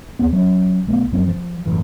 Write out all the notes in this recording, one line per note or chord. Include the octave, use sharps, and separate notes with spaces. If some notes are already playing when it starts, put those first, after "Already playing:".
D#2 B3 C4
F#3 C#4
B1 A3 B3
F#2 F#3 C4
F3
F#1 C2 A2 E3